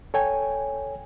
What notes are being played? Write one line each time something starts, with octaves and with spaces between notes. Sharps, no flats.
A4 C#5 G5 G#5